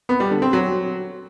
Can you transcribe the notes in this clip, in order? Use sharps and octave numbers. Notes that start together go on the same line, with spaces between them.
B3
G3
D3
C4
F#3